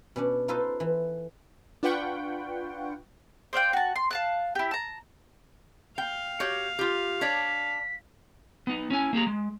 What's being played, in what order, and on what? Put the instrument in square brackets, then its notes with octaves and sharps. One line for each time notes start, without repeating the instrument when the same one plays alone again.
[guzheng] B2 C#4 D4
D#4 F4 A4 B4 C5 D#5
E3
[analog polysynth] D4 F4 B4 F#5 G5 C#6
[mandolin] C5 D5 F5 G5
F#4 A5
C6
F5 A5 F#6
E4 G4
A5 A#5
[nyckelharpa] F5 [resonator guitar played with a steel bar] G5
[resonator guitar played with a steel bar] F#4 G4 C#5
F4 G4
[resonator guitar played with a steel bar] D4 C#5 D5 [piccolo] B6
[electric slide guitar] B3 D#4
C#4 E4 G#5
A#3 G4 G#4 A#5
G#3